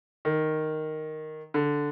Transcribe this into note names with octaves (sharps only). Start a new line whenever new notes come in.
D#3
D3